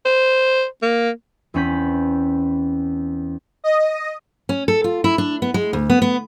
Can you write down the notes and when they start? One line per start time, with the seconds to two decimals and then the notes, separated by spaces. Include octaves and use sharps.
0.05 C5
0.82 A#3
1.54 E2 C4 C#4 B5 G6 B6
3.64 D#5
4.49 C#4
4.68 A4
4.84 F4
5.04 E4
5.18 D4
5.42 B3
5.54 G#3
5.73 D2
5.90 B3
6.02 B3